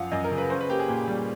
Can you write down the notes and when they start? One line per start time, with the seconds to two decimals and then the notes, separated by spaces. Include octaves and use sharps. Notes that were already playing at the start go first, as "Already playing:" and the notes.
Already playing: F#2 F3 F5 F#5
0.12 F#2 D#5
0.24 A#4
0.31 C#3
0.38 B4
0.50 C#4 C5
0.61 B4
0.69 A#3 G4
0.79 G#4
0.88 A#2
1.08 G3